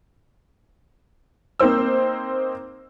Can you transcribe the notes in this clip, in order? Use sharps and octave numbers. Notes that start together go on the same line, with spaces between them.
A#3 C4 D#4 C5 E6